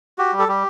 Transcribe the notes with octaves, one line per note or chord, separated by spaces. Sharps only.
F#4 G4
G3
A4
G3 G4